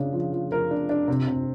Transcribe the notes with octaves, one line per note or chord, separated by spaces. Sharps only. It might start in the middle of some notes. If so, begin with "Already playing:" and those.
Already playing: C#3 D4
F3
F3
F3 A#4
D4
D4
C3
C3